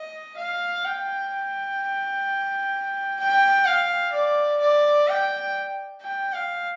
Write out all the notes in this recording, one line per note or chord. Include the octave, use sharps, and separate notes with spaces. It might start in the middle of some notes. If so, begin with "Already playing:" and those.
Already playing: D#5
F5
G5
G5
F5
D5
D5
G5
G5
F5